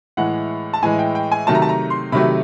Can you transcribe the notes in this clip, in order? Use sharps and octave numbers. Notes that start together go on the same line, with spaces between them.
A2 E3 G#3 F#5
A5
A2 E3 G#3 G#5
G5
G5
G#5
C3 D#3 F#3 A3 A5
A#5
A5
A#5
C6
C3 D#3 F#3 A3 B5